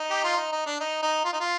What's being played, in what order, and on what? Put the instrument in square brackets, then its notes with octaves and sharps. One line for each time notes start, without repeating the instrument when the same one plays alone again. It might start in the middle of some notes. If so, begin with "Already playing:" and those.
Already playing: [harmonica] D#4
G4
F4
D#4
D#4
D4
D#4
D#4
F4
D#4
F4